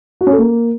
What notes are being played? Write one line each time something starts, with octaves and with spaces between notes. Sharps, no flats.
F#4
C#4
A4
A#3